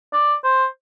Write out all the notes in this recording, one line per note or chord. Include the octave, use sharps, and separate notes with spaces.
D5
C5